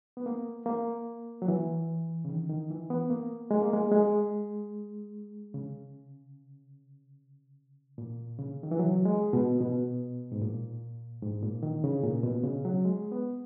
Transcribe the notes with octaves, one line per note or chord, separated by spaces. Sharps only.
B3
A#3
A#3
F#3
E3
C#3
D#3
D#3
E3
B3
A#3
G#3
A#3
G#3
G#3
C#3
A#2
C#3
D#3
E3
F#3
G#3
B2
B2
G#2
A#2
G#2
A#2
D#3
C#3
A#2
B2
C#3
F#3
G#3
B3